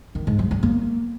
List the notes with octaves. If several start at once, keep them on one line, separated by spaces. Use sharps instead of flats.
D#3
G#2
F#3
G3
A#3